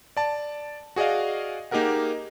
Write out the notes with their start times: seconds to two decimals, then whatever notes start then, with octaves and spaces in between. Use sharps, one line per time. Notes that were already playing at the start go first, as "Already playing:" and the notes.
0.17 D5 A5
0.96 F#4 G#4 D5 D#5 F5
1.71 A#3 D#4 G4 G#4 A#4 F#5